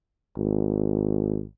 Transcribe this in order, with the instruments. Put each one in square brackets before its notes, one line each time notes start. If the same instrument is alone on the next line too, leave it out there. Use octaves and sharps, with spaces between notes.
[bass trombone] G#1